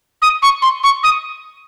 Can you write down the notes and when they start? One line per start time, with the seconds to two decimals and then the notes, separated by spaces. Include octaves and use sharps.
0.22 D#6
0.42 C#6
0.62 C6
0.83 C#6
1.03 D#6